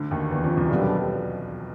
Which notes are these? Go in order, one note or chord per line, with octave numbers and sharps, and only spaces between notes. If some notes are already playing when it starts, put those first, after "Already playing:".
Already playing: D2 D3
D#2 D#3
E2 E3
F2 F3
C2 C3
B1 F#2 B2 D3 G3